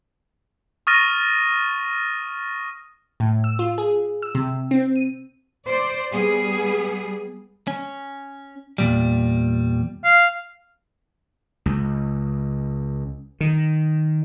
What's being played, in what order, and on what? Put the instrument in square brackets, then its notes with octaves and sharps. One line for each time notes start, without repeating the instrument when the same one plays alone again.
[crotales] C#6 D#6 F6 A6 A#6 D#7
[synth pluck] A2
E6
F4
G#4
E6
C3
C4
D#7
[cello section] C5 D5
G3 B3 G#4
[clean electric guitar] C#4
E2 A#2 G3
[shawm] F5
[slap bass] C#2
D#3